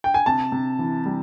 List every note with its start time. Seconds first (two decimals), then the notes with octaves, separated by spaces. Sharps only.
0.04 G5
0.14 G#5
0.26 C3 A5
0.52 C3
0.79 E3
1.06 G3